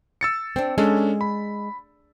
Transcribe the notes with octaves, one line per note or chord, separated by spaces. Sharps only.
E6 A6 C#7
C4 D4
G#3 C#4 D4 A4
B5